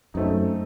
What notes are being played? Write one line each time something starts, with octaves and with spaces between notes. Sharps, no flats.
F#2 A3 C4 D#4